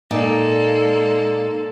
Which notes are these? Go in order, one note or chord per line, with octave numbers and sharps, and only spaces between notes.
A#2 G#3 A#3 D#4 A4 D5